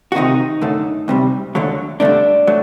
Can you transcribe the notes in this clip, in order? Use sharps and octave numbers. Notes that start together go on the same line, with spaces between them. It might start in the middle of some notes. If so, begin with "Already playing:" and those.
F#4
D2 C3 D#3 D#4
F#2 D3 A3
D2 C3 G3
D#2 D3 F#3 A3
G2 D3 A3 D4
F#3 A3